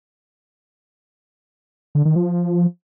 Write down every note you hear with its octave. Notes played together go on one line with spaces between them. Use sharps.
D3
D#3
F3